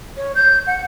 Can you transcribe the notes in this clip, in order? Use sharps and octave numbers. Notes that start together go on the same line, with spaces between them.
C#5
G6
F#5